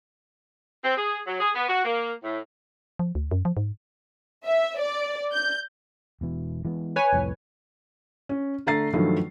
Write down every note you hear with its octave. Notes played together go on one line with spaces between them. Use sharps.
C4
G#4
F#3
G#4
B3
F#4
A#3
A2
F3
D2
F#2
F3
G#2
E5
D5
G6
E1 B2 E3
E3 G#3 B3
B4 C#5 G#5
C2 F2 A2
C#4
D3 A3 A#5 A6 C7
G2 D#3 F3 F#3 A3